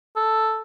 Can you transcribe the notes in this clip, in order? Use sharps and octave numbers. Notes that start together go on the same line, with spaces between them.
A4